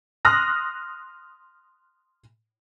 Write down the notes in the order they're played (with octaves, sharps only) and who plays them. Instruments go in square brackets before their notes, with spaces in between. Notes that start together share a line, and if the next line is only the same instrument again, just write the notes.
[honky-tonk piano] C6 D#6 F6 F#6 A#6